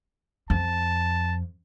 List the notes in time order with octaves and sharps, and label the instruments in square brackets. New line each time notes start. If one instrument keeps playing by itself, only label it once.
[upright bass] F2 [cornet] A5